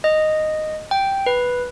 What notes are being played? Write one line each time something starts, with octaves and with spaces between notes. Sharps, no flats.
D#5
G5
B4